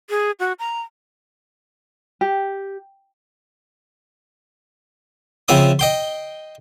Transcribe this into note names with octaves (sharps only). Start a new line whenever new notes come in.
G#4
F#4
A#5
G4
C#3 F3 C4 E5 B5 D#6
D#5 G5 C6